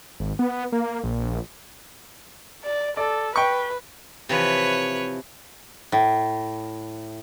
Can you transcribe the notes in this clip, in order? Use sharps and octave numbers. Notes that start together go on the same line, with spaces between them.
G#1
B3
A#3
A#1
D5
A4 D5
B4 G5 C#6
C3 E3 F3 B4 C#5
A2